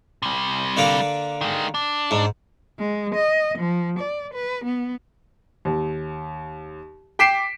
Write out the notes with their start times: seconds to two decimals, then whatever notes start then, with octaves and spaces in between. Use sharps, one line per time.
0.22 C3 G3
0.77 D3 A#3 D4
1.41 D#3 G#3
1.74 D4
2.11 G#2
2.79 G#3
3.15 D#5
3.58 F3
3.99 D5
4.34 B4
4.65 B3
5.65 D#2
7.19 G5 D6 B6 C7 D7 E7